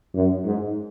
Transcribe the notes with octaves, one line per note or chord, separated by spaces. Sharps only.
F#2
G#2